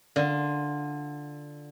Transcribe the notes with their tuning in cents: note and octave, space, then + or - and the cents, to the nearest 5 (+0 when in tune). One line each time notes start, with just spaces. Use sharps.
D3 +0 F4 +0